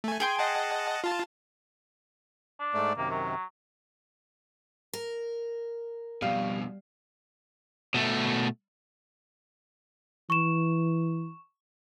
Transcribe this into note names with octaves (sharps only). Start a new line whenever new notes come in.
A3 G#5
G#4 G5 G#5 C6
D#5 F#5 A5
F4 A5
D4
G#2 A3 D5
F#2 C3 D#3 A#3
F#3
A#4
F2 B2 G3 F5
B2 A3
E3 C#6 E7